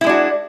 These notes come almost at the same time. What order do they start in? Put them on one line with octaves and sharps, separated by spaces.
E4 G#3 D4 F#4